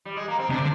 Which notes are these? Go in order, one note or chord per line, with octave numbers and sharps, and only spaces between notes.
G3
G#3
A#3
C4
C3 D4
D3